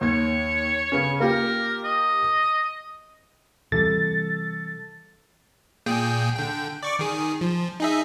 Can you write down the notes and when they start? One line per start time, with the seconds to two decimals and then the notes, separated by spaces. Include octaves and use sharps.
0.01 D#2 C#5 G#6
0.92 C#3 B3 C#4 C#5
1.20 A#3 F4 G4 A#4
1.84 D#5
3.72 C3 E3 G3 A4 A6
5.86 A#2 G#4 G5
6.36 D3 G5
6.83 D5 C#6 D6
6.99 D#3 G#4
7.41 F3
7.80 D#4 G#4 E5